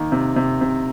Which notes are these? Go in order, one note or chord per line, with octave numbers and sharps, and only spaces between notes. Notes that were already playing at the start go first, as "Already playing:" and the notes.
Already playing: D#3 A#3
C3
C3
C3